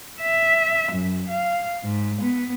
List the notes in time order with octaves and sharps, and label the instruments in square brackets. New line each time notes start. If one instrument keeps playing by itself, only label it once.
[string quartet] E5
F#2
F5
G#2
B3